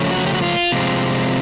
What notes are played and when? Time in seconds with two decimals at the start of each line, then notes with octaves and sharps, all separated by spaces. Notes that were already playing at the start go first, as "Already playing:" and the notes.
Already playing: C#3 F3 A3 C#4
0.11 F#4
0.27 G4
0.34 F#4
0.42 F4
0.72 C3 F3 G#3 C4